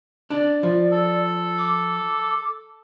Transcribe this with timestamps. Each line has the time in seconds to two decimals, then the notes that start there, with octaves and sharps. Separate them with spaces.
0.30 D4 D5
0.63 F3
0.91 A4
1.58 D6